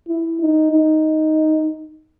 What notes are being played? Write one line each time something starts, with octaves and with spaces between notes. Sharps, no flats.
E4
D#4
D#4